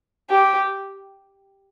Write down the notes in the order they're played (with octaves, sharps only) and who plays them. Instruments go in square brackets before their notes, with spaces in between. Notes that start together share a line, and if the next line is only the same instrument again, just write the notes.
[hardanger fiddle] G4